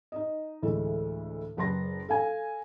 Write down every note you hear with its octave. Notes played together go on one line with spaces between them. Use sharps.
D#4 D#5
D2 A2 E3 G#3 A3
F#1 B4 A5 C6 A#6
A4 F5 G#5